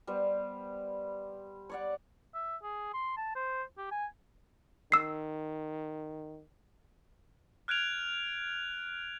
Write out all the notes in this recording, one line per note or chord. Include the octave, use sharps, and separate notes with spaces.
G3 B3 C5
C#5 D5 F#5
E5
G#4
C6
A5
C5
G4
G#5
D#3 E6 C7
F6 F#6 G#6 D7 F7